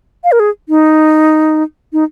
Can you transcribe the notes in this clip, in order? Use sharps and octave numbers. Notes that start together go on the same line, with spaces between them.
F5
A#4
G#4
D#4
D#4